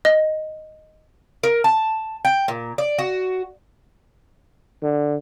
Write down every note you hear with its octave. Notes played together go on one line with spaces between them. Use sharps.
D#5
A#4
A5
G5
A#2
D5
F#4
D3